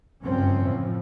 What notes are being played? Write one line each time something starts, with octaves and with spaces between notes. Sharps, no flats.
F#1 G2 D3 F3 C4 C#4
A2 E3 F3